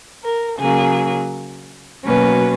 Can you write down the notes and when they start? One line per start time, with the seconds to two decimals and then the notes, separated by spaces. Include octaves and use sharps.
0.23 A#4
0.58 C#3 F#3 A#3 G#4
2.05 B2 F#3 A#3 C#4 B4